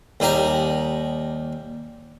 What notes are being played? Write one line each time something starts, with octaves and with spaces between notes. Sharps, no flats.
D#2 G3 D#4 G#5 A#5